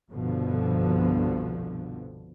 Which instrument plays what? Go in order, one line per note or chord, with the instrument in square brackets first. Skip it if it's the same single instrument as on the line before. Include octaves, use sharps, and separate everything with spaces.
[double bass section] G1 C2 G2 B2 D3 F3